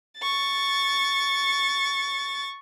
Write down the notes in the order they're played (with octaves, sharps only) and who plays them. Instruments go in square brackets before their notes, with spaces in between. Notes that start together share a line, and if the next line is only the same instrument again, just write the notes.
[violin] C#6 A6